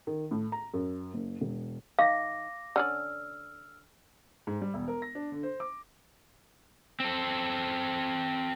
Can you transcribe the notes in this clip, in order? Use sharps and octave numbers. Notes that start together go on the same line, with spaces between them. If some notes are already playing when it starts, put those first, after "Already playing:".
D#3
A2
A#5
F#2
F#1
E1
D#3 F5 D6 A#6
D3 C#4 D5 E6 F6
G#2
G3
E1
A#4
A#6
D4
D3
C5
D6
C4 A4